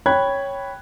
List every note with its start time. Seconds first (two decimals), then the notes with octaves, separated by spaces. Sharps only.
0.06 C#5 G5 B5 F#6 G#6